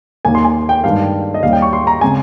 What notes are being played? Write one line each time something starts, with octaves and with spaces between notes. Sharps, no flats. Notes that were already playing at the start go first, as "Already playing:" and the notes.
D#2 D#3 A#3 G#5
C6
G#5
G5
G2 D#3 G#3 F5
D#5
D#2 D#3 G3 C#4 F5
G5
C#6
C6
A#5
C#3 G#3 C4 G#5